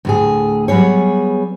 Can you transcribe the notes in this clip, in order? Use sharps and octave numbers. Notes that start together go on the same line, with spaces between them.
D2 A2 G#4
F#3 G3 B3 G#4 C#5